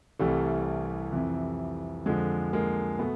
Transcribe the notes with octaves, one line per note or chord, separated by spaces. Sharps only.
C2 C3 E3 G3 A3
F2 C3 E3
F2 D3 F3 G#3
G#3 A#3
B2 A3 B3